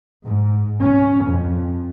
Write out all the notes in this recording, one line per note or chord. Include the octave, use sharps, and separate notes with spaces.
G#2
C#4
F2